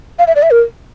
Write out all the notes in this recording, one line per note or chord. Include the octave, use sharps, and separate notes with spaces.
F5
E5
D5
E5
A#4